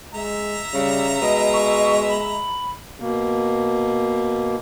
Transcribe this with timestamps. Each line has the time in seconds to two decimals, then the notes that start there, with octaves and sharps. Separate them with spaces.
0.14 G#3 E5 A#5
0.74 C#3 G3
1.21 B2 G#3 D#5
1.53 C#6
2.08 B5
3.00 B2 A#3